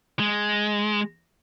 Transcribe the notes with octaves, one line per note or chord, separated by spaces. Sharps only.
G#3